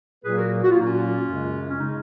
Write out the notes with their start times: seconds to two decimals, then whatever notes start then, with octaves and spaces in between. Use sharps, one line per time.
0.24 A#2 F#3 A#3 G#4 B4
0.37 F#4 A#4
0.63 F#4
0.71 F4
0.76 A#2 F#3 A#3 D#4
0.86 C#4 F4
1.27 F#2 C#3 G#3
1.70 C#4
1.79 C#3 G#3 D#4